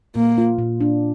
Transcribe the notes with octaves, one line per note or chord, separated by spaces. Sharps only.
A#2 A#3
F4
A#2
D4